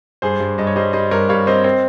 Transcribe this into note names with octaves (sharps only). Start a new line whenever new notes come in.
G2 G#4 C5
G2
G2 D#5
C#5
G3 C5 D#5
G3 C5 D#5
G2 A#4 C#5
G3 C#5 F5
C4 C5 D#5
C4